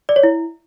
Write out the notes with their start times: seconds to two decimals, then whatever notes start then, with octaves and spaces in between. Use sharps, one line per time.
0.09 D5
0.16 C#5
0.23 E4